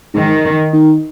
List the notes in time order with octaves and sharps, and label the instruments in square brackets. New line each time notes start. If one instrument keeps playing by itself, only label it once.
[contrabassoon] G#2 [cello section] D#3
[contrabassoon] D#3